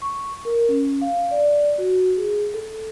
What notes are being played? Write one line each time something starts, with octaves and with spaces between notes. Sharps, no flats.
C#6
A#4
C#4
F5
D5
F#4
G#4
A4